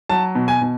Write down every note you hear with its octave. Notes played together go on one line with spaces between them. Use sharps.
F#3 A5
B2
G#5
B2